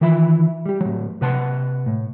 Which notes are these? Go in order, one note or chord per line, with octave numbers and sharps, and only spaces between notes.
D#3 E3 F4 E5 B5
G3 G4
A2 F#3
C3 B4 F#5 A5 C6
A2